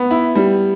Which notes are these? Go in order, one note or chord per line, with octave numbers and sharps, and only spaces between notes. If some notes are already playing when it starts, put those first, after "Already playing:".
Already playing: B3
E4
G3